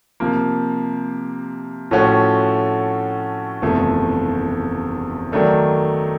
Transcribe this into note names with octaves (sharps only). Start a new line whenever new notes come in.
C3 F3 A#3
A2 F3 A3 C#4 F#4
F#1 E2 C3 F3 A3
D#3 F#3 A3 D4